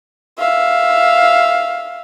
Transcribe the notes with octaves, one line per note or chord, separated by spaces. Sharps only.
E5 F5